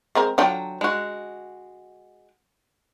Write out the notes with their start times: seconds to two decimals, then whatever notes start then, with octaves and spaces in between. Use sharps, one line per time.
0.15 G#3 C4 A#4
0.38 D3 F#3 D4 F4 G5 A#5
0.81 G#3 F#4